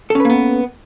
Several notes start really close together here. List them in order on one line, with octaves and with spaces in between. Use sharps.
A4 C#4 B4 A#3 B3